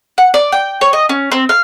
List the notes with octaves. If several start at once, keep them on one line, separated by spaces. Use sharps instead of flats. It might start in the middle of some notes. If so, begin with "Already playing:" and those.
F#5
D5
G5
C#5
D#5
C#4
C4
F5